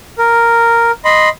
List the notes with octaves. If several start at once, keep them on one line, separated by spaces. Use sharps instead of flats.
A#4
D#5 B5 C6